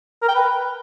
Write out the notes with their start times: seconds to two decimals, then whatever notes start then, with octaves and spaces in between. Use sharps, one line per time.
0.22 A#4
0.28 G5
0.35 B4